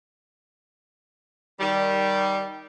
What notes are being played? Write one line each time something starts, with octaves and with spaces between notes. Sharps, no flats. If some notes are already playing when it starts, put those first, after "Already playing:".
D#3 G3